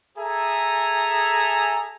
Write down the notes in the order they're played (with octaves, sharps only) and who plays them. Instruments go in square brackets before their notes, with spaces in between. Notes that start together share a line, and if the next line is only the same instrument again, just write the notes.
[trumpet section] G#4 A4 E5 G#5 A#5